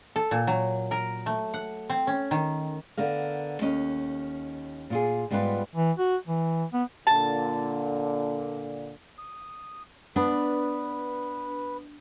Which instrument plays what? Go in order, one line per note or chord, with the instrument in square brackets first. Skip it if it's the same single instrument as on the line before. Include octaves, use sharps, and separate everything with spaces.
[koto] A4
A#2
F#3
A#4
A3
F#5
C4
C#4
D#3
[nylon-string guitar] D3 B3 A#4 F5
D#2 C#4 D#5
A#2 F4 G#4
G#2 G3 B3 E4 F4 B4
[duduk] E3
F#4
E3
B3
[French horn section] A#2 D3 [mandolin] A5
[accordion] D#6
[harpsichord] B3 [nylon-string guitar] D4 [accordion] B4